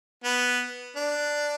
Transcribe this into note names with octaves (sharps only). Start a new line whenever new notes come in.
B3
D4